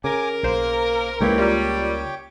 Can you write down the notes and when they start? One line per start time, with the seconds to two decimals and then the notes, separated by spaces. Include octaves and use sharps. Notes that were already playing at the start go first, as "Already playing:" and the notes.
0.04 C#3 A#4 G#5 D6
0.43 B1 A#3 C5
1.21 C#2 D3 E3 G#3 A#3 G4 C#5 G5
1.38 G3 F4 A#4 D5